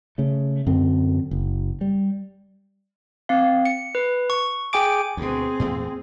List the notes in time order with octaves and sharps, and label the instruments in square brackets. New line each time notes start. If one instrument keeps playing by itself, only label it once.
[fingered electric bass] C#3 A3
F#2 D3 C4
F#1
G3
[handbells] C4 F5
C#7
B4
C#6
G#4 G5 G#5 D6 D7
[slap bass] D2 B2 [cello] C4 G#4
[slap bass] E2 A#2 A3